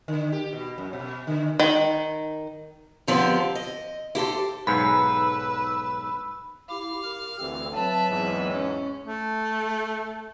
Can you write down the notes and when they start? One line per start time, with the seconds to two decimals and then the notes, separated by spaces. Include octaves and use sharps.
0.08 D3
0.32 G4
0.53 B2
0.78 F#2
0.93 B2
1.27 D3
1.60 D#3
3.07 G#2 D3 F3 B3 C4 G4
3.55 D#5
4.15 E4 G4 A4 C5
4.67 B1 G#2 B4 B5 E6
6.70 E4 G4 F5 D6
7.04 G4 A#4
7.39 D2 E3 C4 A4
7.74 F#3 C4 B4 E5 A5
8.09 E2 G#2
8.51 C#4
9.04 A3